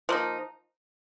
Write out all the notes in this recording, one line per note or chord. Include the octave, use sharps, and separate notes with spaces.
F3 A#3 D#4